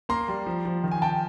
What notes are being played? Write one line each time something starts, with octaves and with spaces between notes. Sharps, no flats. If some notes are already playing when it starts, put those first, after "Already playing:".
A#3 A#5 C6
G3
F3
F3
D#3
G#5
D#3 G5 A5